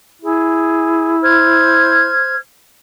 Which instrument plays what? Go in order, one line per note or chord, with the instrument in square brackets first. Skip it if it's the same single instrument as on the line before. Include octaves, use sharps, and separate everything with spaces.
[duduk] E4 [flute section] G#4
[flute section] C5 F6 G#6